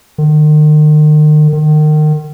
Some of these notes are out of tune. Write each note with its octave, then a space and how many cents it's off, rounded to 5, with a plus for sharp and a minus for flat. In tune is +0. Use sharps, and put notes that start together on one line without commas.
D#3 -40
D#3 -30